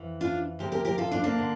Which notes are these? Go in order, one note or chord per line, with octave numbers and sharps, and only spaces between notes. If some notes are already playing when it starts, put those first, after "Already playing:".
Already playing: F2 E3
D4 F4
D2 D3 G4 A#4
G4 A#4
G4 A#4
F4 A4
D4 F4
A#3 D4
D3